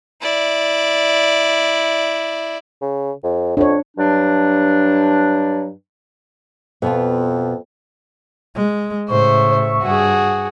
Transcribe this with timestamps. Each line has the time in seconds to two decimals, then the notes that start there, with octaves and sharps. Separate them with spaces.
0.21 E4 D5
2.81 C#3
3.24 F2
3.57 F2 D4 C#5
3.97 G2 F#3 D4
6.82 F2 B2 B3 F4
8.55 G#3
9.09 A2 C#3 C5 E5 C#6
9.83 G2 F#4 G#4